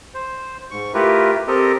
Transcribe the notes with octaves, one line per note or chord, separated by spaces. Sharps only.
C5
G#2 C#6
A3 E4 F4 G4 A#4 B4
C4 G4 A4 A#4 D#5